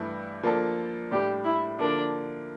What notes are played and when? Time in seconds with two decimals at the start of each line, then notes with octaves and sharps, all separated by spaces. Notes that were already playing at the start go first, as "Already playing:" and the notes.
Already playing: G2 E3 A3 E4
0.43 F3 A#3 D4 A4
1.11 A2 G3 D4 G4
1.44 E4
1.79 D3 F3 A#3 D4